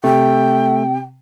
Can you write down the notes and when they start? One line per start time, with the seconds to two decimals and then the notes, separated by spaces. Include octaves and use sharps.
0.04 C3 A3 G5